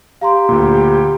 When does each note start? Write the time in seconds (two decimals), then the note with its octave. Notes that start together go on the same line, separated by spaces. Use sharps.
0.21 G4 F5 A#5 C6
0.49 D2 A#2